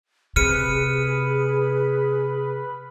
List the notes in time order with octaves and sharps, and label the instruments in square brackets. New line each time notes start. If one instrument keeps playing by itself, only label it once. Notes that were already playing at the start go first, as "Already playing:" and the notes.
[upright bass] C3 [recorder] G#4 [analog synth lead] B4 [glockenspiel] F6 C#7 D#7